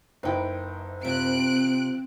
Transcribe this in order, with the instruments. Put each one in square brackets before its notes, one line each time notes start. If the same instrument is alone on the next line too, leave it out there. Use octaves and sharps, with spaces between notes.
[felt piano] F#1 D#4 E4 [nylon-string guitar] B4 G5
[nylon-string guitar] C3 F3 [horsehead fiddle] C4 [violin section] F#6 D7